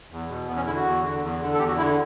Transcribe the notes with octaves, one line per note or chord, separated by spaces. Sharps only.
E2
B2
E2 B3
C#4
D3 E4
F#4
E2
D3
E2
D3
A4
E2 G4
F#4
D3 E4